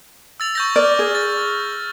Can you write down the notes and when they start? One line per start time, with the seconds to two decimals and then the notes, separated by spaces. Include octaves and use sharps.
0.40 E6 A6 F7
0.55 C#6 G6 A#6
0.76 D5 F6
0.99 G#4
1.15 A6